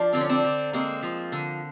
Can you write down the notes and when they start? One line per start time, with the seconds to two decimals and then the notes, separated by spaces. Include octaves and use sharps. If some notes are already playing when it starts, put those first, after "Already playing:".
Already playing: F3 D4
0.13 D3 C4
0.21 C#4
0.29 C4 D4
0.44 D3
0.73 G#3 A#3 C4
1.03 F3
1.32 D3